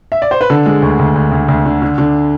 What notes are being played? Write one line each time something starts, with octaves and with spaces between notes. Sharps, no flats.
E5
D5
C5
B4
D3 A4
G#3
D2
D2
D2
D2
D2
D3
D3
D3